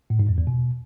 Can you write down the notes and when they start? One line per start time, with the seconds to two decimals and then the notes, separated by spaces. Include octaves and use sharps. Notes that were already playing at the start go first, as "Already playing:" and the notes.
0.10 A2
0.19 G#2
0.29 F2
0.38 E2
0.47 B2